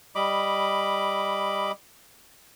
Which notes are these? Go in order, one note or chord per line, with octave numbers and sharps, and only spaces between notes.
G3 D#5 B5 D6